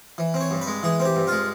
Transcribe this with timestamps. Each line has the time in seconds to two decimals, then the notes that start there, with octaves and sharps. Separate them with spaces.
0.18 E3
0.34 C4
0.41 C#5
0.51 G2
0.61 B4
0.67 G#3
0.83 E3 G#4
1.00 C4
1.05 G4
1.16 G2
1.27 G#3 F4